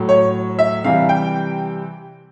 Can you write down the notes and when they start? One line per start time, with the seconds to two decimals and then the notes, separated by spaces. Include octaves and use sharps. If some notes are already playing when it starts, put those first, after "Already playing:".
Already playing: A2 F#3
0.09 C#5
0.59 E5
0.84 C3 E3 G3 F5
1.09 G5